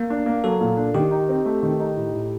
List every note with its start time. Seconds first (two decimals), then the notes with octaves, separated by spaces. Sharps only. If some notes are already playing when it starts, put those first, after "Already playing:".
Already playing: A#3
0.10 D4
0.26 A#3
0.44 F#3 A4
0.61 A#2
0.77 D4
0.94 D#3 G4
1.11 D#4
1.29 C4
1.45 A3
1.63 D#3
1.80 D#4
1.97 A2
2.13 A2